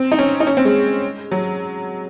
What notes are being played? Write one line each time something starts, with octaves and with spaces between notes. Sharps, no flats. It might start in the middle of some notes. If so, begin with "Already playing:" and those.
Already playing: C4
D#4
C#4
D#4
C#4
C4
G#3
F#3